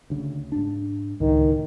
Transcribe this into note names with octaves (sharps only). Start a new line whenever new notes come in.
D2 C#3
G#2 D4
C#2 A2 D#3